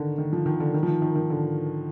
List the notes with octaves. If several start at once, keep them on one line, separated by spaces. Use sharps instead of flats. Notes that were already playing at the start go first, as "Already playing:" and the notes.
Already playing: D3 D#3
D#3
F3
D#3
D3
D#3
F3
D#3
D#3
D#3
D3